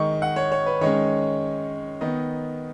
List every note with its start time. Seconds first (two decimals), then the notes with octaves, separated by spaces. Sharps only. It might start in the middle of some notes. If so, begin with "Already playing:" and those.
Already playing: D#3 G#3 D#4 C#6
0.22 F#5
0.36 C#5
0.52 C#5
0.66 B4
0.81 D#3 G#3 C#4 C#5
2.01 D#3 B3 D#4 D#5